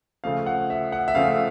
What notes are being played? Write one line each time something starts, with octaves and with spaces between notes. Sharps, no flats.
C#3 F3 A3 F5
F#5
E5
F#5
E5
C#3 F3 A3 F5